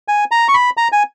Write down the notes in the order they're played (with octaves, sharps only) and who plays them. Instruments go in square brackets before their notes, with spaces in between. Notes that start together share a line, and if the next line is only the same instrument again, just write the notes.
[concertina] G#5
A#5
C#6
B5
A#5
G#5